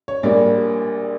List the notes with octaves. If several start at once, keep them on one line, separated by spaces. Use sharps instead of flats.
C#5
A#1 A#2 G3 A#3 D5